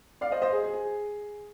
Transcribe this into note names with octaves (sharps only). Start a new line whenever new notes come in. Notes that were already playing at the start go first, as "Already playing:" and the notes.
D5 F5
C5 D#5
C5 D#5
G#4 C5
G#4
G#4